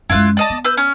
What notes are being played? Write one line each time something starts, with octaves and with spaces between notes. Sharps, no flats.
F#2 G#3 E4 F4 F#6
D5 D#5 A5
B3
B4 E6 G6
C#4